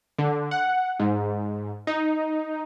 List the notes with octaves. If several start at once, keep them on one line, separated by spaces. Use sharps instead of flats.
D3
F#5
G#2
D#4